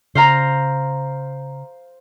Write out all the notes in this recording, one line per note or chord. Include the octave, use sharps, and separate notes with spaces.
C#3 C5 F5 A#5